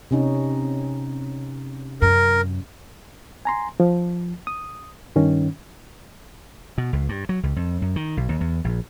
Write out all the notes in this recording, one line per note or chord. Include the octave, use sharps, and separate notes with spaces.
C3 C#4 D#4
F#2 A#4
G#5 A#5 C6
F3
D#6
G2 D#3 C#4
B2
C#2
G2
F#3
C#2
F2
F#2
D#3
B1
D#2
E2
A#1